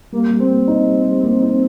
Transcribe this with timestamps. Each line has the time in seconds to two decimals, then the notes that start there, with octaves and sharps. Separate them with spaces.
0.12 G3 A#3
0.31 G3
0.40 C4
0.49 A#3
0.68 D#4
0.86 G3
1.05 G3
1.23 A#3
1.42 D#4